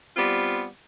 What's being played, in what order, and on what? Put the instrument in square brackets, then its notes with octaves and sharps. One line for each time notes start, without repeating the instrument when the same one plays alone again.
[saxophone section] G3 B3 C4 F4